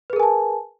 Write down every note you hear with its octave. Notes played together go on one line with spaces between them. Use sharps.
G#4 A#4 B4 G#5 A5